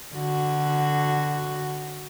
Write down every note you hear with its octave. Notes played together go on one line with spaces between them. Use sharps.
D3 F#4